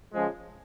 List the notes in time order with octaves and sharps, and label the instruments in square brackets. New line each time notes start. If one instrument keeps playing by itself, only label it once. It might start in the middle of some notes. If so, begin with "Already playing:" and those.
[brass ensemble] C#3 F3 G#3